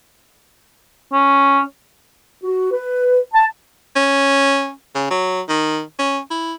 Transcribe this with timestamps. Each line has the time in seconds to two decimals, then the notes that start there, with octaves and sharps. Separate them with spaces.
1.13 C#4
2.44 F#4
2.72 B4
3.34 A5
3.96 C#4
4.95 C#3
5.10 F#3
5.49 D#3
5.99 C#4
6.31 E4